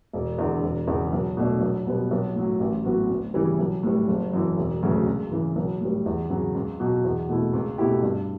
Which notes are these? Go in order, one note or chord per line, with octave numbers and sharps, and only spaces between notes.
E1
E2 D3
E1
E2 C#3
B1
B2 A3 D4
B1
B2 G3 B3
B1
A2 F#3
A1
A2 F#3 B3 F#4
D2
C#3 E3 G3
B1
A2 G3
F#1
F#2 E3
E1
D2 C#3 F#3 A3
C#2
C#3 E3
B1
A2 G3
E2
C#3 F#3
C#2
B2 F#3
E2
B2 A3 E4
C#2
B2 A3 E4 G4
G2